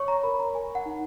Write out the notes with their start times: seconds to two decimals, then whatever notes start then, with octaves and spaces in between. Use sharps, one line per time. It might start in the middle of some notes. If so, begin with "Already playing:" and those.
Already playing: C#5 C#6
0.08 A#5
0.23 A#4 B5
0.40 A#5
0.55 A#4 G#5
0.75 F#5
0.86 D#4